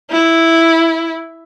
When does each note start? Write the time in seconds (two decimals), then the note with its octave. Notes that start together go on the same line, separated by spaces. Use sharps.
0.11 E4